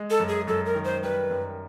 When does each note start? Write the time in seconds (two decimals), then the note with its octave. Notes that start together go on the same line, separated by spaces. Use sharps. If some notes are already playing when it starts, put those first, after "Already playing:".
Already playing: G#3
0.10 A4
0.20 F#2
0.28 G#4
0.47 F#2 A4
0.66 A#4
0.75 D#3
0.85 C5
1.03 G3 B4
1.31 F#2